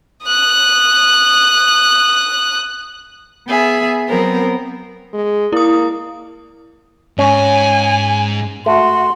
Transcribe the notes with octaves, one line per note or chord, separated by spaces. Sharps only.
D#6 F#6
B3 G#4 E5
F#3 B3 C4 A#4
G#3
A#3 E4 D#6
G#2 C#4 G#5
A3 F#4 C6